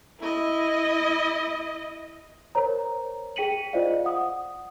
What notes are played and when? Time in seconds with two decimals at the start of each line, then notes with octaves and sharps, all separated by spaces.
0.21 E4 D#5
2.55 A#4 C5 C#5 A#5
3.36 G#4 G5 B6 C#7 D#7 F#7
3.73 F4 C5 D5 D#5 F5
4.05 F#5 D#6